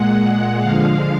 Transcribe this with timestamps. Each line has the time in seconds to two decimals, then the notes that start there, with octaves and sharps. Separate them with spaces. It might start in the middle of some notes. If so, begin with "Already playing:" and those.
Already playing: A#2 G#3 F#5
0.59 D3 F3 G#3 F5